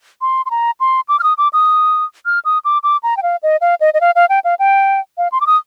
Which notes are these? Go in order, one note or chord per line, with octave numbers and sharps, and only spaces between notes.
C6
C6
A#5
C6
D6
F6
D#6
D6
D#6
F6
D#6
D6
D6
A#5
G5
F5
D#5
F5
D#5
D#5
F5
F5
G5
F5
G5
F5
C6
D6
D#6